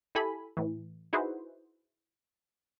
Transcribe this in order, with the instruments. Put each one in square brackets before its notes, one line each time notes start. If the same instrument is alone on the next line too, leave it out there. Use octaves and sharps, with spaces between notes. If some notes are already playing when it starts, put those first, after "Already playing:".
[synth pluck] E4 G4 A4 G#5 B5
A2 E3
D#4 E4 F#4 G#4 B4 C5